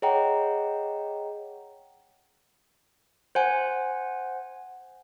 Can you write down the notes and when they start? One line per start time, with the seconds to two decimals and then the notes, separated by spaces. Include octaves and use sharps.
0.02 G#4 C#5 D#5 F#5 G5 A#5
3.35 C5 F#5 G#5